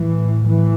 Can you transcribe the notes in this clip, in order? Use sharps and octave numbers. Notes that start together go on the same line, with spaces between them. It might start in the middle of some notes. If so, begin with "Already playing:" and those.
Already playing: A2 E3
E3